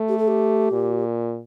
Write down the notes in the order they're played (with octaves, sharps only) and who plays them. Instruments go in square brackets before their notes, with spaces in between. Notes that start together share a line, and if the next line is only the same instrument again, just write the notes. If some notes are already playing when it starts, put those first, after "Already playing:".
Already playing: [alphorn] A3
[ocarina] G4
A4
G4
[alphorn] A#2